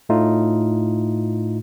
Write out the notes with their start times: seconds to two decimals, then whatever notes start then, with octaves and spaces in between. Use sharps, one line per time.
0.09 A2 A3 D#4 F4